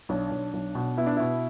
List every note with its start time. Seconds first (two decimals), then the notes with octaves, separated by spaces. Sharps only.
0.09 B1 D4
0.31 B1
0.53 B1
0.75 B2
0.97 B3 E4
1.06 D4
1.16 B2 E4